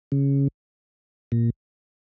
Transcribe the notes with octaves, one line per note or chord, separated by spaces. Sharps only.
C#3
A#2